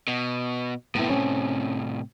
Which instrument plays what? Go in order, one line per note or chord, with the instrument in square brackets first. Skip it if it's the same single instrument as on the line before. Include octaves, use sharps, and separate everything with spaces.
[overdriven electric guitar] B2
[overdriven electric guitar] A2 C3 [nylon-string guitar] B3 E4
[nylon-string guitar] C4 C#4